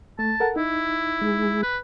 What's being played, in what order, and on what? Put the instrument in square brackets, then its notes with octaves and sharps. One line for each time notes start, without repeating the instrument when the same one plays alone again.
[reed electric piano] A3 [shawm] A5
[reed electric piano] A4 A#4 F#5
[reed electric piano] D#4 [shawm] E4
[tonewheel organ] G#3
[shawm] B4